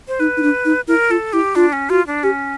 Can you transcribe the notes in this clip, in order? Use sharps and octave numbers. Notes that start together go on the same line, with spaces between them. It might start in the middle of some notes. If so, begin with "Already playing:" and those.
C5
D#4 B4
D#4
D4
D#4
E4 A#4
F4 A4
E4 G4
D4 F4
C#4
F4 F#4
D4
C#4 G4